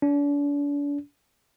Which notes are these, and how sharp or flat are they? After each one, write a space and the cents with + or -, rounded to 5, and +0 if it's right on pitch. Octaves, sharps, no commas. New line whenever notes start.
D4 -40